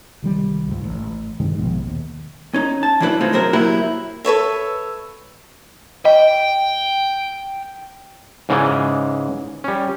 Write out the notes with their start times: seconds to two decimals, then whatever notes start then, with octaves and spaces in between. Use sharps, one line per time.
0.22 C2 D#3 G3
0.68 C#2 G#2
0.84 A1
1.40 G2 C3 D#3 G#3
1.58 A#1 F2 B2
1.86 D#2
2.54 C#4 D#4
2.83 A5
3.00 E3 F#3 D4 E4 B4
3.21 G#3 A3 C4 D#4 F4
3.33 C3 F#3 G#3 C4 A#4
3.53 F#3 A#3 E4 F#4 G4
4.25 A4 B4 C#5 E5
6.05 D#5 G5
8.49 G#2 C#3 E3 G#3 D5 G#5
9.64 G3 C#4